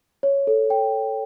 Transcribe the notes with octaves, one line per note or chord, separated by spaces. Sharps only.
C#5
A4
G5